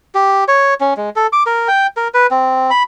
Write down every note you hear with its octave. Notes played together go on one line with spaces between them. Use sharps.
G4
C#5
C#4
G#3
A4
D6
A#4
G5
A#4
B4
C4
B5